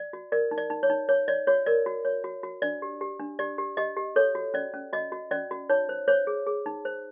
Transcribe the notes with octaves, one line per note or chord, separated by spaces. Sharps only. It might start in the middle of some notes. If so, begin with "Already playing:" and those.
Already playing: D5
F#4
A#4 D5
D#4
D5
D#4
C#5
D#4
C#5
C#5 D5
F#4 C#5
A#4 D5
F#4
C#5
F#4
F#4
D4 D5
G4
G4
D4
G4 D5
G4
G4 D#5
G4
A4 C#5
F#4
C#4 D5
C#4
F#4 D#5
F#4
C#4 D5
F#4
D#4 C#5
C5
C5 C#5
G#4
G#4
D#4
C5